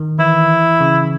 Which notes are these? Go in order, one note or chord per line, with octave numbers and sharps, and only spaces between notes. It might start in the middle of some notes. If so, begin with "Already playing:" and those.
Already playing: D#3
E3 E4
C#3